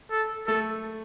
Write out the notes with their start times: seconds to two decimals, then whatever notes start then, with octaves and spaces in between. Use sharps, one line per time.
0.11 A4
0.48 A3 A4